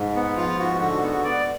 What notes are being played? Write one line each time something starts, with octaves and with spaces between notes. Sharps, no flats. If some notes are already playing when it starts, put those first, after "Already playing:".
Already playing: G#2
B3
F3 F4
G#2 F#4
D3 F#4
B3 F#4
B3 D5